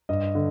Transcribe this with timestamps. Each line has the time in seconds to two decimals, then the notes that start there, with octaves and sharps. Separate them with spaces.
0.09 G2 D#5
0.35 D3